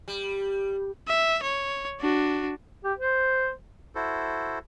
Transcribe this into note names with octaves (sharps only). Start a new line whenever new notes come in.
G3
E5
C#5
D4 F#4
G4
C5
E4 F#4 A4 C5